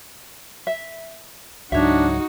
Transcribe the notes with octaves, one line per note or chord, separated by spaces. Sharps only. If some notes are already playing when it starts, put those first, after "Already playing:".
E5
C#2 G#2 F#3 D4 D#4 F#4 C#5 E5